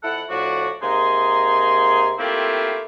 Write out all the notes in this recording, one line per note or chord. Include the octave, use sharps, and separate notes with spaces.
F2 E4 A4 F#5
A2 F3 D4 F#4
C3 A#3 D#4 G#4 C6
A3 A#3 C4 E4 F4 G4